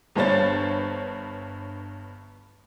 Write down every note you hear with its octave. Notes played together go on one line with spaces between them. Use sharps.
G1 G2 C5 C#5 A6